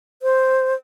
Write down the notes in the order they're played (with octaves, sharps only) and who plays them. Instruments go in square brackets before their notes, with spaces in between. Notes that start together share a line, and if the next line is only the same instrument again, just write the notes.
[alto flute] C5